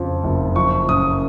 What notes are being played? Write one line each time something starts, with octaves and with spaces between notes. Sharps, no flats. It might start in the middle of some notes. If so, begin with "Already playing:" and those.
Already playing: F2 C#3 F3
F#1
F3 C#6
F#2 D#6